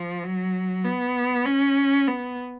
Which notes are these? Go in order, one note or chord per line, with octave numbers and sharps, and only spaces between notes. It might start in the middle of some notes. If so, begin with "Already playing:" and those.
Already playing: F3
F#3
B3
C#4
B3